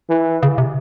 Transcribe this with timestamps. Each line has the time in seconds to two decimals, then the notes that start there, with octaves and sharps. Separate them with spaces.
0.10 E3
0.43 C#3
0.58 C3